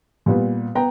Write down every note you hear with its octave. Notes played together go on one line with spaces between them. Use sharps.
A#2 G3 B3
B3 G5 A#5